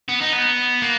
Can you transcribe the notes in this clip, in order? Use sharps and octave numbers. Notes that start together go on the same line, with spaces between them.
B3
D#4
B3
A#3